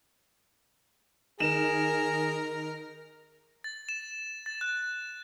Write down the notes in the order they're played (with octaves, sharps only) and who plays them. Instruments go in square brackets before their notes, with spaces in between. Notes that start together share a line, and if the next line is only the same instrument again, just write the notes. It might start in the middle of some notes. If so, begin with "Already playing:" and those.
[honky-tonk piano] D#3 E7 [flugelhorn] G#4 [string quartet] A#4
[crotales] A6
E7
A6
F#6